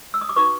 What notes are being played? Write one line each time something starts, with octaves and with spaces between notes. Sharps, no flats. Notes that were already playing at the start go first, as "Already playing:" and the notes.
E6
D#6
D6
D#4 F#4 B4 C#6